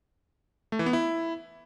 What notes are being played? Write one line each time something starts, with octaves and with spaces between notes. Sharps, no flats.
A3
E3
B3
E4